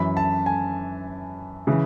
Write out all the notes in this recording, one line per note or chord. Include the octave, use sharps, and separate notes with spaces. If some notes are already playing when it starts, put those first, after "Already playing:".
Already playing: F#2 E3 B5
A5
G#5
C#3 E3